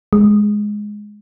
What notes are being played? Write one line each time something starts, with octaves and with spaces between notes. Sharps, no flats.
G#3